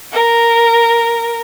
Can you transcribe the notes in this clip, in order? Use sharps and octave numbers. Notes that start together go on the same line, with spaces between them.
A#4